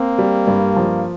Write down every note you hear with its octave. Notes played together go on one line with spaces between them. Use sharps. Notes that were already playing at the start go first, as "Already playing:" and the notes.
Already playing: A#3 C4
G3
G2
F3